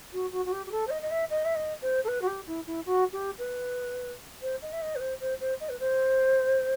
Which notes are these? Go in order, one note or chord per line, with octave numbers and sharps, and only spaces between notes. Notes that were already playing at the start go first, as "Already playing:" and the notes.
F#4
F#4
F#4
G4
G4
A4
C5
D#5
D#5
E5
D#5
E5
D#5
C5
A4
B4
F#4
G4
E4
E4
F#4
G4
B4
C5
D#5
E5
D#5
B4
C5
C5
C5
D#5
B4
C5